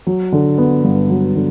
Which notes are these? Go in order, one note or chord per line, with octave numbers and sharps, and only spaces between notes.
F#3
D3
B3
G2
F#3
D3